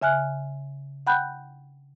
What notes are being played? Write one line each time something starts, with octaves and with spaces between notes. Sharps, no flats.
C#3 E5 G#5 F6 F#6
F#5 G5 B5 F#6 G6